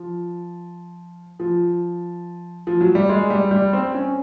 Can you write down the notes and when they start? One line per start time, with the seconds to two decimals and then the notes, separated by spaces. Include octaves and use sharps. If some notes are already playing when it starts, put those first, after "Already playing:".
Already playing: F3
1.40 F3
2.67 F3
2.81 F#3
2.95 G3
3.09 G#3
3.30 G3
3.51 G3
3.73 C4
3.94 C#4